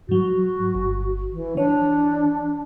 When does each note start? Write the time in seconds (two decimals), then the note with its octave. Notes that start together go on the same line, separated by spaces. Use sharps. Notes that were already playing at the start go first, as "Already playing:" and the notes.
0.09 G#2 F#3 F#4
0.75 G1
1.33 E3
1.57 E3 D4 C#5